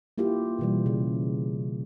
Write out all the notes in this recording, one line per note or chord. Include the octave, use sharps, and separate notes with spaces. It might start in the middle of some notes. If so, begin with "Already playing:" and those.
A#3 E4 F4 G4
B2 E3 G3
C#3